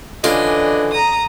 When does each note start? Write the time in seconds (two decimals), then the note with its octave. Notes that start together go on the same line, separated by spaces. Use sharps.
0.24 D3 E3 C#4 D4 F4 D#5
0.92 A#5 D#6